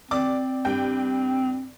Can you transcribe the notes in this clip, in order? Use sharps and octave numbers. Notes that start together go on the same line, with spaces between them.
C4 D5 D6
G2 G5